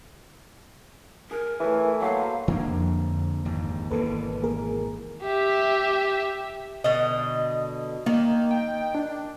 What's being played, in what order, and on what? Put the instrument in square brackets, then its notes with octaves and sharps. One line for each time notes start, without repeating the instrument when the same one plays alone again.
[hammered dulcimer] G#4 G#5 [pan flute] A#4
[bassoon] E3 [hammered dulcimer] A3 C#5 G#5
[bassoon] F#3 [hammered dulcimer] A#3 B4 C5 [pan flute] F5
[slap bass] D3 A#3 C4
[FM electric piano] F2
[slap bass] G#1 D#2 G#2
[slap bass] G#1 B2 E3 [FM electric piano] A#3 A4 B4
[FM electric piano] A#3 G#4 A#4
[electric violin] G4 E5
[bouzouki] B2 D3 D#5
[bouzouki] D#3 [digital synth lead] A#3
[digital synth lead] G5
D4